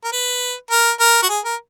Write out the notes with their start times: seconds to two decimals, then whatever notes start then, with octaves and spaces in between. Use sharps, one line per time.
0.05 A#4
0.13 B4
0.71 A#4
1.00 A#4
1.23 F#4
1.29 G#4
1.45 A#4